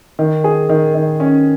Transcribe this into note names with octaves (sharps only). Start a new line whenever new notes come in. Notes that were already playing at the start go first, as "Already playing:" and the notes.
D#3
G#4
D#3
D#3
C#4